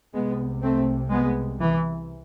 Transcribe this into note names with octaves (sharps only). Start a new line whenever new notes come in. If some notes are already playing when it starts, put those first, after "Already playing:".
C2 C3 G#3 B3
A3 C4
G#3 B3
E3